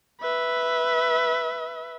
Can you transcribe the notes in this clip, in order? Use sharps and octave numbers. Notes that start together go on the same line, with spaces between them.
B4 E5